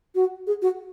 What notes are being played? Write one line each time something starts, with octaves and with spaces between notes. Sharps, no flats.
F#4
G#4
F#4